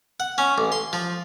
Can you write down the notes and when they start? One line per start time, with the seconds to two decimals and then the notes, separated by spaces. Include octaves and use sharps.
0.20 F#5
0.38 C#4
0.58 A1
0.72 C6
0.93 F3